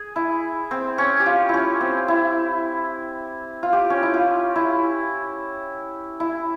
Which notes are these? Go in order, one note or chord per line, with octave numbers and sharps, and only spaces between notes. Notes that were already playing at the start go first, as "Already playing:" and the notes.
Already playing: G#4
E4
C4
C#4
G4
F4
C#4 E4
C4
E4
F4
G4
C#4
E4
F4
E4
E4